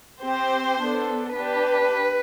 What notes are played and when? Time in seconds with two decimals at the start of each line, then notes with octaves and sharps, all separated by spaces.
0.21 C4 G4 C5
0.79 B3 D4 A4
1.36 D4 G4 B4